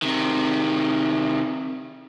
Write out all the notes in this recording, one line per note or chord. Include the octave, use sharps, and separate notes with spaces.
C3 D#3